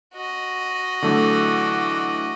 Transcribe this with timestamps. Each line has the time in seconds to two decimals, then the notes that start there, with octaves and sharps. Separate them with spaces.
0.14 F#4 D#5
1.02 D3 E3 F#3 A3 A4 D6